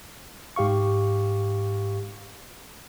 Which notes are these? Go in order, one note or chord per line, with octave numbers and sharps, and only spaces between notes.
G#2 G4 F5 C#6